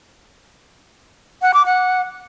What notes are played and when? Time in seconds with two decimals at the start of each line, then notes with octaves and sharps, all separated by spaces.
1.42 F#5
1.54 D6
1.66 F#5